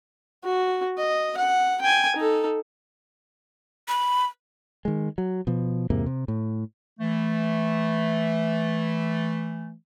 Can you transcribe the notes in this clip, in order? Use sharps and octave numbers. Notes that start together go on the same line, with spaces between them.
F#4
D#5
F#5
G5 G#5
D#4 A4
B5
D#3 G#3
F#3
B2 F3
E2 G#2 C3 A#3
C3
A2
E3 A3